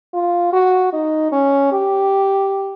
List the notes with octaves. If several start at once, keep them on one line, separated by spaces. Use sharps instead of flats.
F4
F#4
D#4
C#4
G4